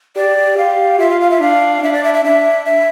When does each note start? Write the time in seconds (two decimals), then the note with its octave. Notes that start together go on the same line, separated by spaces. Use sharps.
0.16 G4 D5
0.57 G4 F5
0.99 F4 E5
1.10 F5
1.21 F5
1.30 E5
1.41 D4 F5
1.82 D4 E5
1.93 D5
2.04 E5
2.14 E5
2.25 D4 E5
2.66 E5